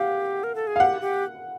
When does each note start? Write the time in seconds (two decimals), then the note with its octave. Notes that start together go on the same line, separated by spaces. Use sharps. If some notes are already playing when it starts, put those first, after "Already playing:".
Already playing: G4 F5 F#5
0.43 A#4
0.55 A4
0.67 G#4
0.76 F5
0.80 G4 F#5
1.01 G4